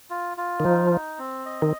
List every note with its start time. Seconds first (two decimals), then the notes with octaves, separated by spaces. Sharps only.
0.10 F4
0.37 F4
0.60 D#3
0.65 F3 D#4
0.91 D#4
1.19 C4
1.46 D#5
1.62 D#3